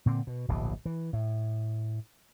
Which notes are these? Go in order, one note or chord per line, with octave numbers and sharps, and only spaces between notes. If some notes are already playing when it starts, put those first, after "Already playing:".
A#2 D3 C4
B2
D1 A#1 B2
E3
A2